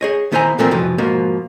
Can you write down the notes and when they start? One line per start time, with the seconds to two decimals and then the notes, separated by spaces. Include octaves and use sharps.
0.01 G#4 C#5 D#5
0.32 D#3 B3 E4 C5 G#5 A#5
0.59 A#2 E3 F3 A3 C4 A#4
0.71 C2 F2 B2 E3 F3
0.98 G#2 B2 F3 A#3